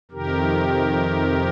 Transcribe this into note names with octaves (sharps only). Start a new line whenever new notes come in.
F2 C3 D#3 G4 A#4